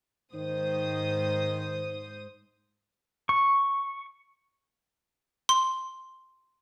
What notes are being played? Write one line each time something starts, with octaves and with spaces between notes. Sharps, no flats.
G#2 D#3 C5 D#6
C#6
C6